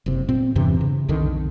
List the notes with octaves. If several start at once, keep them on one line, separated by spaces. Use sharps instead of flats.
F#1 C3
A#2 C4
E2 G2 C3 E3
C#3
B1 F2 D3 D#3